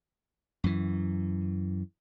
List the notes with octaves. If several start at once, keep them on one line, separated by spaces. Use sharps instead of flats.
F#2 E3